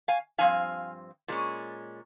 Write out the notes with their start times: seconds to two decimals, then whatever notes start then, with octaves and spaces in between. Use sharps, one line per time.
0.08 F5 G#5
0.38 G2 F3 C4 F5 G#5
1.28 A#2 G#3 C#4